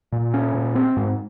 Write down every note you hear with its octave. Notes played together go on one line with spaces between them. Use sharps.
A#2
C#4
A#2
C4
G#2